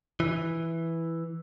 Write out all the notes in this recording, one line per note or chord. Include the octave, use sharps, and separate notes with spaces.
E3